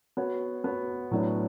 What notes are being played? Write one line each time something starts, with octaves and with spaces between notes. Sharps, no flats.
B3 F#4 C#5
B3 F#4 C#5
A2 F#3 B3 D4